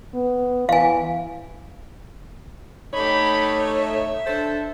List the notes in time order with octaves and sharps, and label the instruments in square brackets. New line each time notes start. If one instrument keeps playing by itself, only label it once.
[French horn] B3
[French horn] E3 [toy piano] F5 G#5
[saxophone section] A3 D#4 C#5 [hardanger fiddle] G4 B5
[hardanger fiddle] E5
[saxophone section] D4 A4 C5